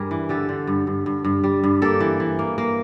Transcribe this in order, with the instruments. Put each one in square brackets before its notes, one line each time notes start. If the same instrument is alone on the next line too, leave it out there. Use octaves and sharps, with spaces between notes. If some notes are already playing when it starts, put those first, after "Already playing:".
Already playing: [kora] G2 G3 G#4 A#4
E3
D3 G4 A4
D3
G2
G2
G2
G2
G3
G2
A#3 G4 A4
E3
E3
A#3
A#3